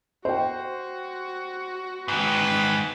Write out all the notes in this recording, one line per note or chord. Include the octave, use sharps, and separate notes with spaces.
F#4 C5 G5
G#2 D#3 B4